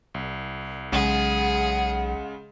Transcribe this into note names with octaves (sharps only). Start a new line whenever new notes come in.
C2
B1 C#3 G#3 G#4 F#5